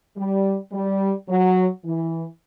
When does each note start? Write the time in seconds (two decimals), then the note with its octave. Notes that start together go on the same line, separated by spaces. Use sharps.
0.17 G3
0.72 G3
1.29 F#3
1.85 E3